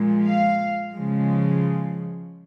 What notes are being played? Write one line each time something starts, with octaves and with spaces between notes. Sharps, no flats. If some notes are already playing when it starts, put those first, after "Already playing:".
Already playing: A#2 F3 G#3
F5
C#3 F3 G#3